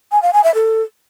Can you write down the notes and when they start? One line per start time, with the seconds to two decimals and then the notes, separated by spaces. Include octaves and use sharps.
0.12 G#5
0.22 F5
0.33 G#5
0.44 E5
0.55 A4